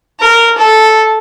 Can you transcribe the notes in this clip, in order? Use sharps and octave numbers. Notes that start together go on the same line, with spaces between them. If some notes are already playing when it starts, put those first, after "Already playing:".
A#4
A4